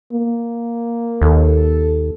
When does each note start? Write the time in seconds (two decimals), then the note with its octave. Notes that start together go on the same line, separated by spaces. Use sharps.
0.13 A#3
1.22 D#2 A4